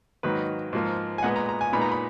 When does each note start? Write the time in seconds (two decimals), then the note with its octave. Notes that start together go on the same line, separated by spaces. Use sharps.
0.23 G#2 D#3 F#3 A#3 B4
0.73 G#2 F3 A#3
1.18 G#5
1.23 A#2 G#3 B3 F#5
1.36 A#5
1.49 A#5
1.61 G#5
1.73 A#2 G#3 B3 D#4 B5
1.81 A#5
1.92 B5